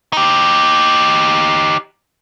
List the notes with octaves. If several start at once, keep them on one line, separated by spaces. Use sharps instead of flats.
D#4 G4